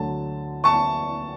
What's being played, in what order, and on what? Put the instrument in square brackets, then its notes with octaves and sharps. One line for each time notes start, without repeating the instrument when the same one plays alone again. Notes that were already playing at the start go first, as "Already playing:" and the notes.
Already playing: [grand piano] D2 D3 F#3 A5
A5 C#6